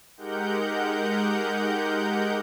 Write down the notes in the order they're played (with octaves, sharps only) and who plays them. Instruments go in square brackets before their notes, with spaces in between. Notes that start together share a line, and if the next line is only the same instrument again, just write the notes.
[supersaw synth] G#3 D#4 G4 A#4 F#5 G6